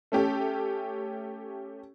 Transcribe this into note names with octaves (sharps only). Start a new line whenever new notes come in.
A3 C#4 G4 A4